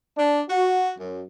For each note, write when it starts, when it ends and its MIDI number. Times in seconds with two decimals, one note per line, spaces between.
0.17 0.41 62
0.49 0.90 66
0.99 1.23 42